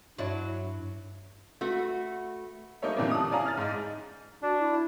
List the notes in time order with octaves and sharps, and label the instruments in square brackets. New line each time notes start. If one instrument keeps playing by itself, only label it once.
[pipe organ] G2 [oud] F#3 D4 E4
[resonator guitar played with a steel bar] A3 F#4 B4
[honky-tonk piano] G3 A3 A#3 D#4 C#5 E5
F2 A#2 D3 E3 G3 A#3
D4 D#6
C#4 E4 D5 F5 G#5 A#5
F6 A6
G#2 D#4
[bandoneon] D4 [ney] F#4
[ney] E4